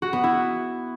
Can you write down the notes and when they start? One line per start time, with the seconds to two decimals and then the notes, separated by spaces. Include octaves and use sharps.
0.02 F#4
0.13 B3
0.24 E4